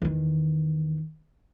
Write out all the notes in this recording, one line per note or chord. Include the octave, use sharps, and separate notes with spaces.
E2 D#3